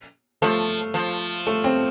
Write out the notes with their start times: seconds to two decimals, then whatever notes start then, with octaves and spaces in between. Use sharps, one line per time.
0.42 F3 A3
0.94 F3
1.47 A3
1.64 C4